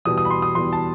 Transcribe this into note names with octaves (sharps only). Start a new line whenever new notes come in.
E2 B2 G3 D#6
D#6
B5
C6
D#6
E2 B2 G3 C6
A5